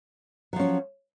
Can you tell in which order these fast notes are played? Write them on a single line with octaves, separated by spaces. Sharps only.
F#3 F3 C#4